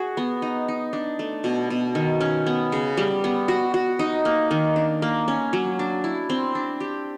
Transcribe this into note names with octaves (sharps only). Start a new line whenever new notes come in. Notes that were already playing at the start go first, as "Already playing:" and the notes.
Already playing: F#4 G#4
B3
D#4
D#4
D4
A3
B2
B2
D#3
C#4
B3
C#3
G3
B3
F#4
F#4
D#4
A#3
D#3
D4
A#3
C#4
F#3
D4
E4
C4
D4
G4